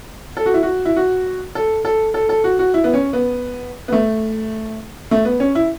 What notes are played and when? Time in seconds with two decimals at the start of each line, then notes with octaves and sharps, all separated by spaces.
0.37 A4
0.46 F#4
0.54 E4
0.63 F#4
0.85 E4
0.96 F#4
1.55 A4
1.85 A4
2.14 A4
2.29 A4
2.44 F#4
2.59 F#4
2.74 E4
2.84 B3
2.94 C#4
3.13 B3
3.88 B3
3.92 A3
5.11 A3
5.25 B3
5.40 C#4
5.55 E4